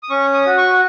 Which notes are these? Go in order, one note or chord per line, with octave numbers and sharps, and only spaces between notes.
D#6
C#4 C#6
D#6
F#4
C#6